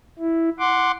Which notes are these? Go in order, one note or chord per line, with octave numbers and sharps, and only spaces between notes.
E4
F#5 C6 D6